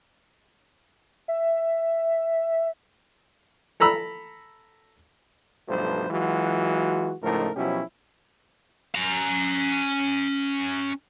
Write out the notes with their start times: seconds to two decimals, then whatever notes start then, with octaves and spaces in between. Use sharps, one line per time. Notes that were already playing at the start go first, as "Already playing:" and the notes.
1.28 E5
3.80 A4 A#5 B5 E6
5.68 B1 G2 F3 A3 B4 C5
6.10 E3 F#3 G#3 F4 F#4
7.22 C#2 A2 F3 A3 D#4 A#4
7.56 B2 F3 F#3 C#4 E4 G4
8.95 C#4 A#5